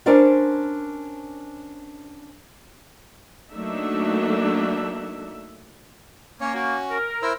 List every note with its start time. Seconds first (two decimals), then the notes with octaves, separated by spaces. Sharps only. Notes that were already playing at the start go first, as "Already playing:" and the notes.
0.06 C#4 D4 A#4 C5 D5 F5
3.52 F#3 A3 A#3 D4 D#4 E5
6.41 A#3 C#4 C#5
6.54 C#4 F#4
6.91 A#4
7.22 E4 C5 E6